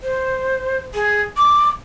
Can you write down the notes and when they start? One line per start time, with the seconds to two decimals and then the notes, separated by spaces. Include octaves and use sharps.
0.03 C5
0.94 G#4
1.37 D6